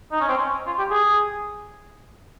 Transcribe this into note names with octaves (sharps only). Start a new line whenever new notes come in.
D#4
C#4
C4
C#4
F4
G4
G#4